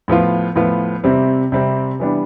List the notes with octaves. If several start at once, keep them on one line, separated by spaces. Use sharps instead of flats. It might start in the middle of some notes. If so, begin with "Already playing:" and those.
A2 F3 B3 F4
A2 F3 B3 F4
C3 G3 C4 G4
C3 G3 C4 G4
E3 G3 B3 D4 G4